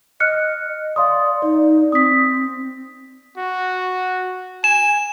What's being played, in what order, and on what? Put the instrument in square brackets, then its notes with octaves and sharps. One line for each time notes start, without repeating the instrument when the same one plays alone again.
[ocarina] D#5 [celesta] F6 F#6 C#7
[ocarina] D5 [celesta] F5 C6 D#6
[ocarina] D#4 [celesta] D5
[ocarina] C4 [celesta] D#6 B6
[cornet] F#4
[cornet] G#5 [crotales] E7